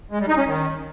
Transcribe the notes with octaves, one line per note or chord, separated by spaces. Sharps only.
G#3
G3
D#4
C#4
D#3